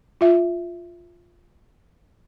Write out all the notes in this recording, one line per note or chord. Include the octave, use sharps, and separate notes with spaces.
F4 E5